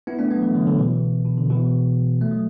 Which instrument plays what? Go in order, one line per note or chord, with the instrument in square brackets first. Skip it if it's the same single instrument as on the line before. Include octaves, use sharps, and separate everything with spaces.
[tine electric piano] B3 E4
A3 D4
F#3 B3
E3 A3
D3 F#3
D3 F#3
B2 E3
B2
D3
B2 E3
A3
F#3